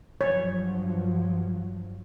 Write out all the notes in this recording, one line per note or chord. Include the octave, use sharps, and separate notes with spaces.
G2 F3 F#3 C#5